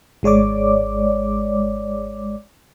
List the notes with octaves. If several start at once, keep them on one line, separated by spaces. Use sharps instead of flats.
G#1 G#3 C#5 D5 D6